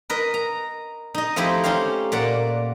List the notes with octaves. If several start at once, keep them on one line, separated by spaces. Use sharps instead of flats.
A#4 B4 D#5
A#5
D#4 D#5
F3 A3 C4 D#4 E4 G4
C#4 D#4 G4 C5 F5
A#2 A#3 D5 F#5